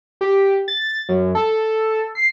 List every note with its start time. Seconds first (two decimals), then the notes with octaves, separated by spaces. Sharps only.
0.21 G4
0.68 A6
1.09 F#2
1.35 A4
2.15 C7